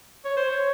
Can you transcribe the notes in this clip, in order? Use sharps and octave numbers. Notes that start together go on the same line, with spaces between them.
C#5
C5
C#5